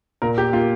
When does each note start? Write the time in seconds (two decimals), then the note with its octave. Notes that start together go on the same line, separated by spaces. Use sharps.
0.22 A#2 A#4
0.38 G4
0.53 A#3 F4